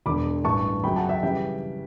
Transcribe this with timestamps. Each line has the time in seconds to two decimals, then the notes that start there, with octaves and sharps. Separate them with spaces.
0.06 E1 E2 D3 B5 D6
0.44 A1 G2 E3 A5 C#6
0.83 F#2 C#3 F#3 G5 B5
0.96 F#5 A5
1.09 E5 G5
1.23 C#3 E3 G3 E5 G5